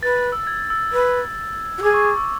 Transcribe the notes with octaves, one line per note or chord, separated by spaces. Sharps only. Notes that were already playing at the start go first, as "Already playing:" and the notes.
B4 A6
E6
G#6
E6
B4
F#4
G#4 D6
C#6
D6
E6